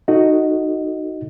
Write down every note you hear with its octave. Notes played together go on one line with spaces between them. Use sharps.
D#4 F#4 A4 D#5